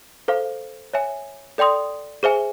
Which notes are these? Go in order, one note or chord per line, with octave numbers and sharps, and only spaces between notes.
A4 C5 F5
C#5 E5 G#5
A4 D5 G5 C6 D#6
G#4 C5 E5 G#5